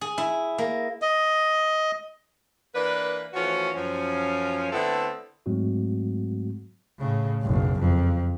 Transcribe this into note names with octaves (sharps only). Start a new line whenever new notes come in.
G#4
E4
A#3
D#5
E3 A#3 D4 B4
E3 F3 A3 C#4 F#4
F#2 F3 C#4
D3 A3 B3 C4 E4 A4
G#2 F#3 G#3 A3 C4 F#4
A2 C#3
F#1 B1
F2